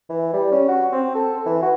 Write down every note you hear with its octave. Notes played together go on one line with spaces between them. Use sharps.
E3
G3
C#4
F#4
C4
A4
E3
F#4